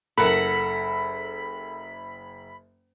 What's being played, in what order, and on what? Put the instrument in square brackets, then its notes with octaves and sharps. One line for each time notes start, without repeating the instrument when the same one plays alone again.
[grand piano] F#1 F#6 [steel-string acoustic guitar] A4 A#4 F#5 [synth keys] B5